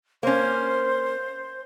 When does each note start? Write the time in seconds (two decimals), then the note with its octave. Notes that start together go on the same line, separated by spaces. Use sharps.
0.23 A#3 C#4 C5